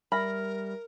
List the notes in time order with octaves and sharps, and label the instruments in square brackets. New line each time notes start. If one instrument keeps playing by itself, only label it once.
[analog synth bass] G3 [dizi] A#4 [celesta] E5 F6 A#6 [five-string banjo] B5